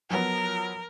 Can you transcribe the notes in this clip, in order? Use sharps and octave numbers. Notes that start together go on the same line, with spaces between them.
F3 F#3 B3 A#4